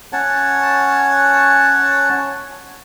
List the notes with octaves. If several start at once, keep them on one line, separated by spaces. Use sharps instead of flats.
C#4 C#5 F#5 A5